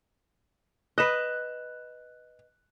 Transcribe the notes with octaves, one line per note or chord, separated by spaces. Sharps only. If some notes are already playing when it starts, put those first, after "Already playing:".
B4 D#5 F#6 E7